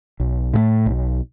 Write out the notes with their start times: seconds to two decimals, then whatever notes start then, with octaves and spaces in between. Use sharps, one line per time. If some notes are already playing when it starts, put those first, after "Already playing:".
0.20 B1
0.53 A2 F#3 A3
0.86 B1